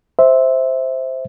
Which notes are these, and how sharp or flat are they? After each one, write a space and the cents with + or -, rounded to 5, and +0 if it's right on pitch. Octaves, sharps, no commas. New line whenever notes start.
C5 +0 E5 -10